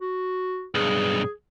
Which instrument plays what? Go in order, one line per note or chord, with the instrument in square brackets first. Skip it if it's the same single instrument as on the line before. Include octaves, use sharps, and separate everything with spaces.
[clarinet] F#4
[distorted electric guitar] B1 G2 [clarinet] G#4